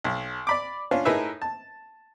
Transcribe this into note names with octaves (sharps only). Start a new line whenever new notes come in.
B1
D5 B5 D6
C#4 D4 F4
A2 D#4 G#4 A#4 B4 E5
A5